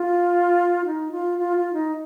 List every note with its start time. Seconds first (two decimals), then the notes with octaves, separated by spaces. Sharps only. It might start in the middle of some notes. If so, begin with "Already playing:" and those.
Already playing: F4
0.85 D#4
1.12 F4
1.39 F4
1.57 F4
1.73 D#4